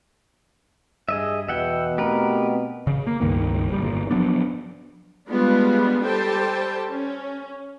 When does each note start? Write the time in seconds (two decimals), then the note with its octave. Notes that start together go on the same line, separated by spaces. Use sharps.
1.09 G2 G#4 D#5 E5
1.48 E2 B2 E5 F#5 G5
1.98 A3 C4 G4 A#4 B4
2.87 C#3
3.07 A#3
3.21 C#2 G2 D#3 A#3
3.69 F#1 G3
3.82 G1 A#2
4.11 F3 F#3 B3 D4
5.29 G3 G#3 B3 D4 F4
6.03 G3 G4 A4 C5 G5 A5
6.89 C#4